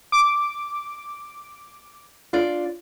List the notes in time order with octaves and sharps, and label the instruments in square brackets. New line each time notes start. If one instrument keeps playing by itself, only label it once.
[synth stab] D6
[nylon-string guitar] D4 F4 D5